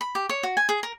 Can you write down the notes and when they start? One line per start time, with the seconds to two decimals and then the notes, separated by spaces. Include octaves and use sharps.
0.01 B5
0.15 G4
0.29 C#5
0.43 F#4
0.57 G#5
0.69 G#4
0.83 A#4